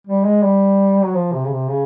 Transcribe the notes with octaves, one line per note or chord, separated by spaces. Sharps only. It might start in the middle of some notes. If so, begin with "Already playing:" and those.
G3
G#3
G3
F#3
F3
C3
C#3
C3
C#3